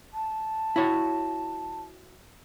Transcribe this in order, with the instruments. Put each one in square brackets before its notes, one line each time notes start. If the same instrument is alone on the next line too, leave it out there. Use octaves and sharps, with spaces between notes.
[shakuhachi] A5
[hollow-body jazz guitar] E4 F#4 C#5